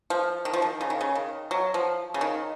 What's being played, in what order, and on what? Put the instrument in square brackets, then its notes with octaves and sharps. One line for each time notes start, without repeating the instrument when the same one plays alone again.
[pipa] F3
D#3
F3
D#3
C#3
D#3
C#3
D#3
F#3
F3
C#3
D#3